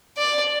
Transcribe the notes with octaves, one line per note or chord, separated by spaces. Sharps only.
D5